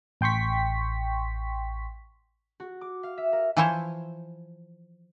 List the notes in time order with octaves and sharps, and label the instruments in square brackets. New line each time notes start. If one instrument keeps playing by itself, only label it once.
[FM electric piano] A1 G5 C6 C#6 B6
[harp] F#4
D6
F5
E5
A#4
[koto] E3 F3 E4 C5 C#5